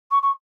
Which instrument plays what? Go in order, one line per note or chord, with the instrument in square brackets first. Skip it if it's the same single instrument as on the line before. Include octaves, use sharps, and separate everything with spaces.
[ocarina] C#6
C#6